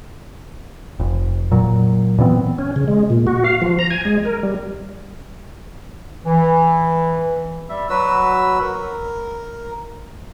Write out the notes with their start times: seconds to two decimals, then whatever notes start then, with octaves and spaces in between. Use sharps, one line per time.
1.00 F1
1.51 A#2 F#3
2.18 A#2 E3 B3 C4
2.58 C#4
2.76 C#3
2.88 G#3
3.10 A#2
3.27 F#4
3.44 F5
3.62 F3
3.79 A#5
3.90 G#5
4.05 G#3
4.25 A#4
4.43 G3
6.25 E3
7.69 G3 E5
7.90 F#3 F#4 B4 E6
8.61 A#4